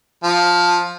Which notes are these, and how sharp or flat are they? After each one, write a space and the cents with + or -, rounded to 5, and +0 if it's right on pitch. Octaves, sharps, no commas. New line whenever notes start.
F3 +10